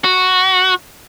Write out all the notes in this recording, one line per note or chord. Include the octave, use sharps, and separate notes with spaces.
F#4